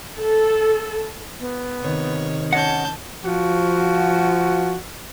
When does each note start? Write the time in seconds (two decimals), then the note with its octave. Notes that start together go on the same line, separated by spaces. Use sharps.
0.19 A4
1.40 B3
1.82 C3 D#3 C#5
2.53 C#4 C#5 D#5 F#5 A5 G6
3.24 F3 F#4